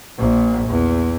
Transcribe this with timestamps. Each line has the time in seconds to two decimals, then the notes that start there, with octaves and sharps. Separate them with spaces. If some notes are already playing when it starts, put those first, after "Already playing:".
0.18 A#1 A#2
0.69 E2